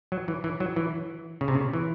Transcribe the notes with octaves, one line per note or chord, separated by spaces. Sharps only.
F#3
E3
E3
F#3
E3
C#3
C3
C#3
E3